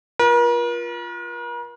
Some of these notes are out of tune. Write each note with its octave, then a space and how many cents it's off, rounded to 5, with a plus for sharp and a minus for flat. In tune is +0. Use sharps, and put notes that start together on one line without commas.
F4 +0 A#4 +45